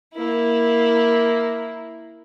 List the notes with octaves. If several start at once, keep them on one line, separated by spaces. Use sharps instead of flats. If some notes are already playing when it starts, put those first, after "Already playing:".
A#3 E4